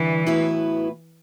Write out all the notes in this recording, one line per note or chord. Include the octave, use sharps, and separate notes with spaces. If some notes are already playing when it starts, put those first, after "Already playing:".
Already playing: G2 D3 E3
A2 F#3 B3 E4 B4